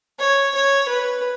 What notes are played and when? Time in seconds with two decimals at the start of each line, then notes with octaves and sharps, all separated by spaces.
0.19 C#5
0.55 C#5
0.88 B4